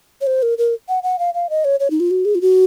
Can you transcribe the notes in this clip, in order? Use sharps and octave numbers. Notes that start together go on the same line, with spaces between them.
C#5
C5
A#4
A#4
F#5
F#5
F5
F5
D#5
C#5
C#5
D#4
F4
F#4
G#4
F4
F#4